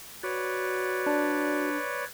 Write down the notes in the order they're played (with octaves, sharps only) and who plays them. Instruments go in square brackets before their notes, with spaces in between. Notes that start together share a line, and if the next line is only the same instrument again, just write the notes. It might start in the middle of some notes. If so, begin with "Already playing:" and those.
[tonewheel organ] F#4 [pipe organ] B4 C#5 D5
[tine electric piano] D4